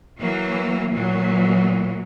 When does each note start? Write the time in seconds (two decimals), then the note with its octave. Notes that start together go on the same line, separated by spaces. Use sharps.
0.19 E3 F#3 A#3
0.93 A#2 E3 F#3